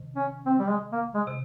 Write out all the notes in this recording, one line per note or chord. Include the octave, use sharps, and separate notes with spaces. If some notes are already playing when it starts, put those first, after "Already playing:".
Already playing: C3 D#3
C#4
C4
G3
G#3
A#3
G#3
C3